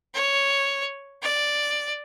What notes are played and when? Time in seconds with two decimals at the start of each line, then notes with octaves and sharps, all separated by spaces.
0.14 C#5
1.22 D5